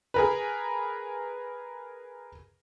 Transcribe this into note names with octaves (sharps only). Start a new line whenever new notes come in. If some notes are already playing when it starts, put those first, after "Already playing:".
G#4 A#4 B4